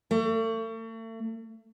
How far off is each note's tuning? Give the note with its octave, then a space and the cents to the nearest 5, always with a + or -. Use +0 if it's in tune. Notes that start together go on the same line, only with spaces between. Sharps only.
A3 +40